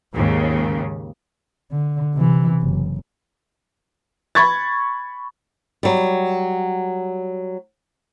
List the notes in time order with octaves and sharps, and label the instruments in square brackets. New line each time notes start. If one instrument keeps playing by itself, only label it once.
[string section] D#2 G#2 C#3
[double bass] D3
C3 E3
F#1
[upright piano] B5 C#6 G#6 A6
[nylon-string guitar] F#3 G3